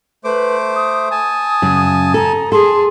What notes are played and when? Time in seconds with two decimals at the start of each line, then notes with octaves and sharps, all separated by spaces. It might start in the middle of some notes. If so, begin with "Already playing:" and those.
0.24 A3 B4 C5 D6
0.75 D#6
1.11 G#5 A5
1.62 F#2 C#3
2.14 A4 A#5
2.52 G#4 A4 A5 C6